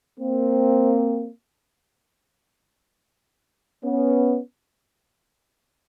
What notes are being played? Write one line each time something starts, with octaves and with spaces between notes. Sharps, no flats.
A#3 C4
B3 C#4